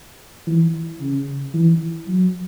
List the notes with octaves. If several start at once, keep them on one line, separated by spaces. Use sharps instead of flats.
E3
C#3
E3
F#3